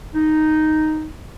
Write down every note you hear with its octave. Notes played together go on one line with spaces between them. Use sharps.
D#4